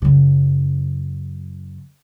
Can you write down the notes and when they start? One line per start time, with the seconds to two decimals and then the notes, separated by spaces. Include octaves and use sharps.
0.02 F#2 C#3